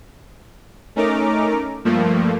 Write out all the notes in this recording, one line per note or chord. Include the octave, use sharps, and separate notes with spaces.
A3 C#4 D#4 A#4 A#5 D6
G2 F3 A3 A#3